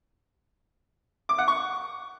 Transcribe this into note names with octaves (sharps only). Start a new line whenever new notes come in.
D6
F#5
C#6